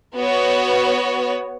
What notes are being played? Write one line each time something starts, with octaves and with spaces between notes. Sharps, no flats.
B3 F#4 C#5